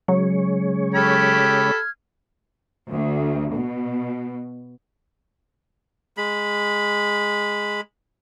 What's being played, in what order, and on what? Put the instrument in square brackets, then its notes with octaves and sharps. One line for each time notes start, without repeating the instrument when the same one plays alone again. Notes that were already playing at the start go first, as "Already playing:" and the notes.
[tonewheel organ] C#3 G#3 C#5 [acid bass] F#3
[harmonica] G4 A4 B5 [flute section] F6 G#6
[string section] D2
B2
[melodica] G#3 B5